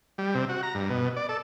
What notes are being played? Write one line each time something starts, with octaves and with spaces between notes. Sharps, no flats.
G3
C3
F#4
A#5
G2
B2
D5
A4